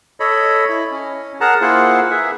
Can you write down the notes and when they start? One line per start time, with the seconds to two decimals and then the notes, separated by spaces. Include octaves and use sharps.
0.20 A4 C#5 D#5 B5
0.69 E4
0.91 C#4
1.41 G#4 A#4 F#5 A5 A#5
1.61 A#3 E4 F4 G#4 C5 F#5
2.11 G#4 B4 E5